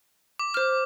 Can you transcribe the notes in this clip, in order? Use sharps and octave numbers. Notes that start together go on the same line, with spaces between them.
D6
C5 F6